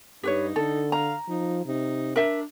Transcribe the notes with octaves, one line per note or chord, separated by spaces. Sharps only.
G2 D#4 G4 B4 C#5
D3 A4
F5 A#5
F3 D#4
C3 D#4
D4 A#4 E5